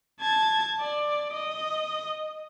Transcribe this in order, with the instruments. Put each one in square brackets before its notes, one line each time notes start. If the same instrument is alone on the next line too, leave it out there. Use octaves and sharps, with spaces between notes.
[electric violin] A5 G#6
D5
D#5